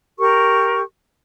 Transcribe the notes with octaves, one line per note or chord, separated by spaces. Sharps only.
G4 A#4 C#6